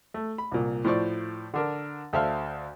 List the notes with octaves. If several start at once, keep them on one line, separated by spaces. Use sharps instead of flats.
A3
B5
C2 A#2
A2 F3 C5 D5 C#6
D3 D4 A#4
D2 A4 C5 E5 F5 F6